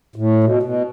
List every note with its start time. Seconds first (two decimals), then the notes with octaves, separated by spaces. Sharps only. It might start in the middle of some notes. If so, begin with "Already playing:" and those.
0.16 A2
0.44 B2
0.63 B2